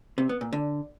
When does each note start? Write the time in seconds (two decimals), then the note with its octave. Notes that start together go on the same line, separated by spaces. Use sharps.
0.18 C3
0.29 B3
0.41 A#2
0.53 D3